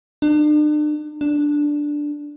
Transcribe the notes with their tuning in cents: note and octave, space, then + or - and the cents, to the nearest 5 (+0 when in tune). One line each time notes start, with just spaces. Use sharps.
D4 +40
D4 +0